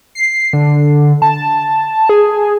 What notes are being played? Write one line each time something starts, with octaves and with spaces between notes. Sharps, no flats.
C7
D3
A5
G#4